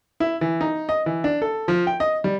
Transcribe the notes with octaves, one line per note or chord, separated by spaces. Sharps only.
E4
E3
D#4
D#5
E3
D4
A4
F3
G5
D#5
G3